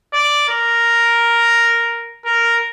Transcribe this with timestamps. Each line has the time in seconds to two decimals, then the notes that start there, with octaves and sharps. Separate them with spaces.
0.14 D5
0.49 A#4
2.25 A#4